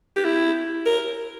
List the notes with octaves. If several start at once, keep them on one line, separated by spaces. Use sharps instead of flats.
G4
E4
A#4